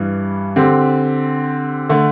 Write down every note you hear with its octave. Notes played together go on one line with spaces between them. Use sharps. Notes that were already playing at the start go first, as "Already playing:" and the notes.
Already playing: G2 E3 G3
D3 C4 G4
D3 A3